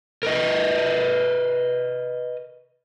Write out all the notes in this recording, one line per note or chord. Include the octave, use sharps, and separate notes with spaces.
A#4 B4 D#5